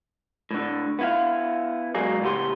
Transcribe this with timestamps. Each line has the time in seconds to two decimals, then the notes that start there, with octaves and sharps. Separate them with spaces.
0.51 A2 D3
0.99 B3 E4 F5
1.94 B1 F#3 G#3 A#3 G#4 D5
2.21 A2 C#3 B3 G4 C6